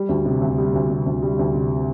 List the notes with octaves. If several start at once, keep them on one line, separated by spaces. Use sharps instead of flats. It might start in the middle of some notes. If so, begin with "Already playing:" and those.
Already playing: G3
D2
C3
D2
G3
D2
C3
D2
G3
D2
C3